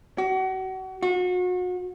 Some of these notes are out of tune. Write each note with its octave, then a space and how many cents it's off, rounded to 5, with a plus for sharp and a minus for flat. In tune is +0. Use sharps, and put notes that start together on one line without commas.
F#4 +30
F#4 -35